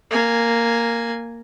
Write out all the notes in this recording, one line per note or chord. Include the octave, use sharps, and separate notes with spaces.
A#3 G#5